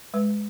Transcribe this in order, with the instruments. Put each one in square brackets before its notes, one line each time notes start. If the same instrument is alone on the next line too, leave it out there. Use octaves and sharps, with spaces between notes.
[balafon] G#3 B4